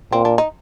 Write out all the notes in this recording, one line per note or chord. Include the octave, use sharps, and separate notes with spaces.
A#2 C4
D4
D#4